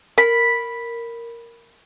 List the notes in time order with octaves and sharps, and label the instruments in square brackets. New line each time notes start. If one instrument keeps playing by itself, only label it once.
[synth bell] A#4 [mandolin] B5